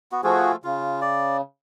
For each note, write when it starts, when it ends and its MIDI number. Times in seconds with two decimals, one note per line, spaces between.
0.12 0.21 59
0.12 0.21 66
0.24 0.52 53
0.24 0.56 57
0.24 0.56 65
0.24 0.52 66
0.24 0.52 68
0.64 1.41 49
0.64 1.00 65
1.02 1.37 74